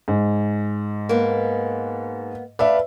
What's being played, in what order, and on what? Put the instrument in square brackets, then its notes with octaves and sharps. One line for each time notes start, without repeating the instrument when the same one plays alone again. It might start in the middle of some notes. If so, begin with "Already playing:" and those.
[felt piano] G#2
[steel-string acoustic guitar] A#3 B3
[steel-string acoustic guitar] A3 B4 F5 [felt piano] D5 E5